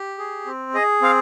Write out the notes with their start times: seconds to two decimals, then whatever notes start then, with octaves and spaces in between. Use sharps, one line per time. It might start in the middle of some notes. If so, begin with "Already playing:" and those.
Already playing: G4
0.19 G#4
0.46 C4
0.74 G#4 D#5
1.02 C4 F5